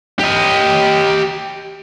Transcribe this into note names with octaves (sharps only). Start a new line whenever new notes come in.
G4 D#5